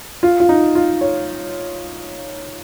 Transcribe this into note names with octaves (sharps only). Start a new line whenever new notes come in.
F4
F4
D#4
F4
C#5